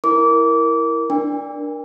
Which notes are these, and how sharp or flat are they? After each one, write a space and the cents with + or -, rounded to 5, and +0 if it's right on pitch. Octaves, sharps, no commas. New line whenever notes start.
E4 +0 A#4 +0 D6 -25
D4 +0 A#4 +20 G5 +45